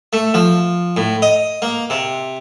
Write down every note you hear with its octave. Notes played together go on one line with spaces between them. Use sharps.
A3
F3
A2
D#5
A#3
C3